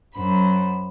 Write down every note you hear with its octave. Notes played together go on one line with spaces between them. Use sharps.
F#2 C5 B5